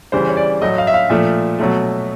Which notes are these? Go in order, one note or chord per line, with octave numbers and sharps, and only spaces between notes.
C#3 E3 G3 C5
C#5
D5
A2 F#3 A3 D#5
F5
E5
F5
A#2 F3 A3 E5
B2 F#3 A3